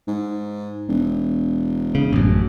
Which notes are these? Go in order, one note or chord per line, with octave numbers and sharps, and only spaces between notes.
G#2
E1
C#3
A1 F#2